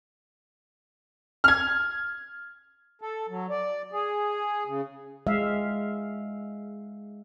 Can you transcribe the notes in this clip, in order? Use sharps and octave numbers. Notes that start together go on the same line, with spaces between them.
F6 G#6
A4
F#3
D5
G#4
C#3
G#3 E5 F5